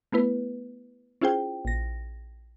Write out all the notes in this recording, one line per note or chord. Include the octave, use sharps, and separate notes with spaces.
A3 B3 E4 B4
C#4 E4 F4 G#4 C5 G5
A#1 A#6